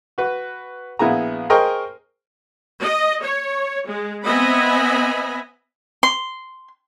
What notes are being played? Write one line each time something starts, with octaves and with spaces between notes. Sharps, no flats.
F#4 B4
A#1 B3 E4 G#4 A#5
G#4 A#4 C5 D#5 G5 C#6
D#5
C#5
G#3
B3 C4 D#5 E5 G#5 B5
C6